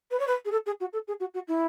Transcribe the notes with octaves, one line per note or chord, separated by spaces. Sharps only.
B4
C#5
B4
G#4
A4
G#4
F#4
A4
G#4
F#4
F#4
E4